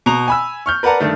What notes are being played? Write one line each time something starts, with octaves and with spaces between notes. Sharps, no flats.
B2 A#5 F7
G#5 B5 E6
C#6 F6 G6
A#4 B4 D5 F#5 A5 A#5
G2 D#3 A3